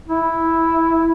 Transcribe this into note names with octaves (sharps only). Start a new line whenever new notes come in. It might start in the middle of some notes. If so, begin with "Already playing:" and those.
E4